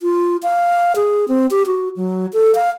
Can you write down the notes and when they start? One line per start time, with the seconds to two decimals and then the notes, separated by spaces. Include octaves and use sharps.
0.01 F4
0.43 F5
0.96 G#4
1.28 C4
1.51 G4
1.66 F#4
1.96 F#3
2.33 A4
2.55 F5